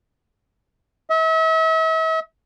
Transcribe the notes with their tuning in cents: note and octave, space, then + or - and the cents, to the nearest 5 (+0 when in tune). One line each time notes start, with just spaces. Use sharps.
E5 -40